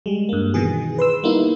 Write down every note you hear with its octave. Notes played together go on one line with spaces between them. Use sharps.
G3 G#3
G2 A#3
B2 D#3 E3 G#4
B4 C6 E6
G3 A#3 B3 D#4 E4